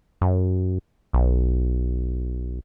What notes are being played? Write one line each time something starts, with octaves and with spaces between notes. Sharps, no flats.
F#2
B1